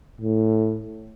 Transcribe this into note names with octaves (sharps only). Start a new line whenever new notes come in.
A2